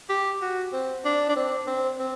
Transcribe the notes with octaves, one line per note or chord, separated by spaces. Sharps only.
G4
F#4
C4
D4
D4
C4
C4
C4